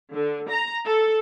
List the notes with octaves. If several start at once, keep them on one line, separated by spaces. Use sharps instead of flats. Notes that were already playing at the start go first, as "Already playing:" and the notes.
D3
A#5
A4